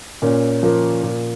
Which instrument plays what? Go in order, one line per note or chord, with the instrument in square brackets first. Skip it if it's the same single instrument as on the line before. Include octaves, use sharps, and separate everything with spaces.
[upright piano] A#2 C#4
F3 A#3
A#2